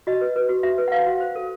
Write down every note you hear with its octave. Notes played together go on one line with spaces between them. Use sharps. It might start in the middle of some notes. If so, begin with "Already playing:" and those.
F#4 D#5
B4
B4
F#4
F#4 E5
B4
F#5
B4 F5
F#4
C5
A4